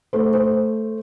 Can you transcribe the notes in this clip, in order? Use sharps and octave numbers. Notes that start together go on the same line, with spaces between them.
A3 C5
C5